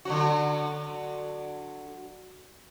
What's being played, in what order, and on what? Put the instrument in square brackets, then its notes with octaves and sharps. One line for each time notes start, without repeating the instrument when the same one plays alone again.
[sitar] D3 F#3 F#4